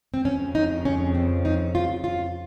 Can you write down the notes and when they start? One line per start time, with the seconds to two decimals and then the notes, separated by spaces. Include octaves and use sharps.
0.14 C4
0.25 F2 C#3 F3 C#4
0.55 D#4
0.85 C#4
1.15 C4
1.45 D#4
1.75 F4
2.04 F4